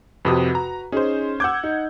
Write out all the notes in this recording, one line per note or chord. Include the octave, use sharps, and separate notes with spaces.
F2 C3 F#4 B4 D#6
A#5
C#4 D#4 G#4 C5
F#5 D6 E6 G6 G#6
D#4